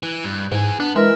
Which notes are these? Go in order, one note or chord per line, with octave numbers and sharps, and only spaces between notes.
E3
G2
G#2 E3 G#4
B3 D4
E3 G#3 A#4 E5